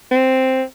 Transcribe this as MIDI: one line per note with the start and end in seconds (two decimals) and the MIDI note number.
0.11 0.63 60